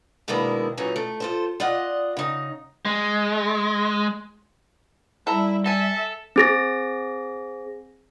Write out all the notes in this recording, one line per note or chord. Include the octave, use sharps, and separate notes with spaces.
B2 D#3 G#3 A#3 D4 E4
F#2 A#2 E3 C#4 D#4
A3
F4 A4 C5
F4 D5 D#5 F#5
C#3 D#4
G#3
G3 E4 A4 A#5
A4 E5 G#5 A5
C4 G#4 A#6